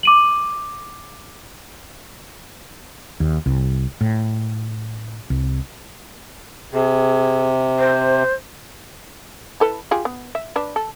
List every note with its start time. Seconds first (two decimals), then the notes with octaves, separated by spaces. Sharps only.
0.03 D6 D#7 F#7
3.20 D#2
3.46 C2
4.01 A2
5.30 C2
6.73 C3 G#4
7.79 C5
9.60 E4 A4 B4
9.91 F4 G4 G#4
10.05 B3
10.35 E5
10.56 D4 B4
10.76 A4